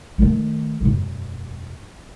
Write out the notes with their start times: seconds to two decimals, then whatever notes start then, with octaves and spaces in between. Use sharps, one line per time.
0.18 D#3 A3
0.81 E1 F#2